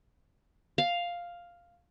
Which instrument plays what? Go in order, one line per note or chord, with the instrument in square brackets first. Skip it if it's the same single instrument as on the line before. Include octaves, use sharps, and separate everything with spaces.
[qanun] F5